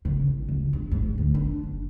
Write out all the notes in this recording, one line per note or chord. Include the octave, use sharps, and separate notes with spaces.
C#3
A1
C#2
G2
G#2
G#2
D2
D4
F#1